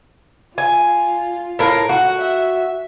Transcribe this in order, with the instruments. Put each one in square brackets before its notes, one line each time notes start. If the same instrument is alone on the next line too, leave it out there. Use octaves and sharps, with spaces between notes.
[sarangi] F4 [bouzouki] G#5
[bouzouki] A2 A#4 F5
[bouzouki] F#4 [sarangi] F#5
[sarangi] E5